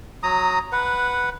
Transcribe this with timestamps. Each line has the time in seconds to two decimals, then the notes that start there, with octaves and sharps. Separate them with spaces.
0.23 F#3 A#5 D#6
0.72 B4 F#5